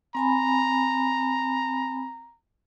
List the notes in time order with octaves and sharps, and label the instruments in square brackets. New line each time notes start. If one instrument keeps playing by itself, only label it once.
[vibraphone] C4 G#5 B5 [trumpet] A#5